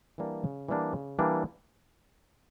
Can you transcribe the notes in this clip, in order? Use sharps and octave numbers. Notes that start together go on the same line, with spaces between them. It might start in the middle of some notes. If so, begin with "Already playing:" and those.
E3 G3 A#3 D4
C#3
E3 G3 A#3 D4
C#3
E3 G3 A#3 D4